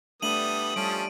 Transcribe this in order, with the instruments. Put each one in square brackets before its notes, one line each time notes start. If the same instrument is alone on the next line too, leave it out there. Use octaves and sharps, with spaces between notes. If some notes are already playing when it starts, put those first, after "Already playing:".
[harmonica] G3 B3 [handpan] A3 D4 [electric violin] D#6 [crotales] D#7 F#7
[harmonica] F3 C#4 A4 [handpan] G3 [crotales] D7